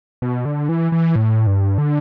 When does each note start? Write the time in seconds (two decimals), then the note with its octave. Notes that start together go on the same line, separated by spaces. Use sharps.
0.22 B2
0.45 D3
0.69 E3
0.92 E3
1.16 A2
1.47 G2
1.78 D3